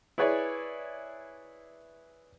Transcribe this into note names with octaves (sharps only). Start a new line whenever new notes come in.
E4 G#4 B4 C#5 D5